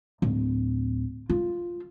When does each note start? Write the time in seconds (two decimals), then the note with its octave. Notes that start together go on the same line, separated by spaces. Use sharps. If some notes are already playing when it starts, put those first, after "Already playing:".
0.22 D1
1.29 F4